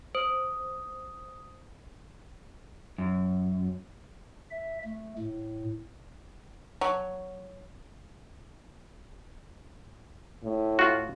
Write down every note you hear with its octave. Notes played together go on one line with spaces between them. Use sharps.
C5 D#6
F#2
E5
A3
A2
F#3
A2
F4 F#4